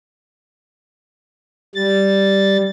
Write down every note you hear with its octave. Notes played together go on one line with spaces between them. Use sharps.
G3 A6